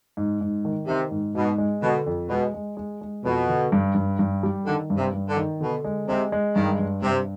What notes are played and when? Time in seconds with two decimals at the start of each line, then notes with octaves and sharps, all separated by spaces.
0.17 G#2
0.41 G#2
0.65 D#3
0.87 C3 D#3
1.11 G#2
1.35 G#2 B2
1.58 G#3
1.82 B2 D3
2.06 F2
2.29 B2 G#3
2.54 G#3
2.77 G#3
3.01 G#3
3.24 F2 B2
3.48 D3
3.72 G2
3.95 G2
4.19 G2
4.43 G3
4.66 D3 D#3
4.90 G2
4.97 C3
5.14 G2
5.29 D3
5.37 D#3
5.60 B2 D3
5.84 G#3
6.08 C3 G#3
6.32 G#3
6.56 G2 D#3
6.79 G2
7.02 G2 C3